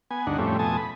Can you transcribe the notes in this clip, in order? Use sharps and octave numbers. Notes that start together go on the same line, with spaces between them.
B3 G#5
D2 G2 D4 D#4 F#5
F2 A2 G3 A3 C4 C#4
F2 B2 A3 G#5 A5 D#6
B5